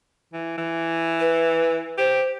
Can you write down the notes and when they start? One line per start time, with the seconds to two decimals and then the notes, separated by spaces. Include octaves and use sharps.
0.33 E3
0.58 E3
1.20 B4
1.98 G4 C5